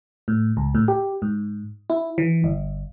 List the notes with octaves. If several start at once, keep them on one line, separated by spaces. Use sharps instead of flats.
A2
C#2
A2
G4
G#2
E4
E3
G1